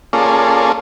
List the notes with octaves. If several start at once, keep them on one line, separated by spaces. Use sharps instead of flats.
A#3 C#4 F4 G#4 A4 D5